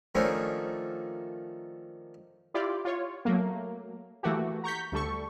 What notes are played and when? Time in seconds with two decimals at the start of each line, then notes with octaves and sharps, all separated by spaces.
0.15 D#3 F3 A3 A#3 C#4 D4
2.54 E4 F4 G4 D5
2.85 F4 C#5
3.25 F#3 A3 A#3
4.23 E3 A3 A#3 F#4 G4
4.64 A#5 C#6 G6 B6
4.92 D2 G3 A4 C#6